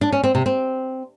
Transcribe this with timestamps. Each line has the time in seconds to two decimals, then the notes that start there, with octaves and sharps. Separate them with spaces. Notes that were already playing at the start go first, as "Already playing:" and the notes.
0.01 D4
0.12 C#4
0.24 C4
0.35 C3
0.46 C4